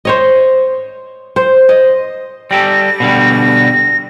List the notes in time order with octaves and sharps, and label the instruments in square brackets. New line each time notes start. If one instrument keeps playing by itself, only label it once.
[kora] C5 C#5 D#5
C5
D#5
[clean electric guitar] G3 G4 A4 [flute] A#6
[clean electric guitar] B2 D3 G3